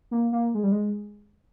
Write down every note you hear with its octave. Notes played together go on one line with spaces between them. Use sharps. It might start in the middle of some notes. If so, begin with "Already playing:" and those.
A#3
A#3
G#3
G3
G#3